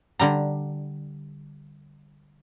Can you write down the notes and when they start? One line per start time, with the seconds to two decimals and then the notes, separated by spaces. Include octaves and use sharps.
0.19 D3 G3 A#5